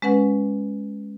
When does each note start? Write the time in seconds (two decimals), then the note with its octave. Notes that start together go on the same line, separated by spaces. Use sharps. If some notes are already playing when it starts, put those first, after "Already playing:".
0.02 G#3 C#4 B4 F#5